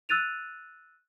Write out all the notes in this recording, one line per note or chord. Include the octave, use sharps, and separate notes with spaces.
E6 F#6 A6 D#7 F7